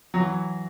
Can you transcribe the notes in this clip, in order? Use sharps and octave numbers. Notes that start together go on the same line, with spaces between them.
F#3
E3